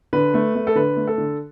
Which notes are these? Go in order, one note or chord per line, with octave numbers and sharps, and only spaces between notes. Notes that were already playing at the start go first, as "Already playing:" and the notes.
D3 B4
A3
A3
A4
D3 B4
A3
A4
D3